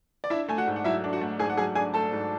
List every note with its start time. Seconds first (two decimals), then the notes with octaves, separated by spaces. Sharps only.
0.24 D5
0.30 D4 E4 E5
0.49 A3 G#5
0.58 F#4 F#5
0.67 G#2
0.76 F#5
0.84 F#3 E4 E5
1.04 D4
1.13 F#4 F#5
1.21 A3
1.39 G#2 G#4 G#5
1.50 F#5
1.57 F#3 G#4 G#5
1.75 D4 G#4 G#5
1.94 A3 A4 A5
2.13 G#2